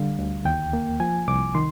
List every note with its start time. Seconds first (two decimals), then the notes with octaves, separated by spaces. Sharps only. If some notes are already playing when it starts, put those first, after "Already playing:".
Already playing: D3 G3 F5
0.19 D2
0.45 D#2 G5
0.73 A#3
1.00 F3 G#5
1.28 C2 D6
1.55 D#3 C6